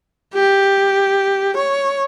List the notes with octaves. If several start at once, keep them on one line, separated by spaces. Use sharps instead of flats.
G4
C#5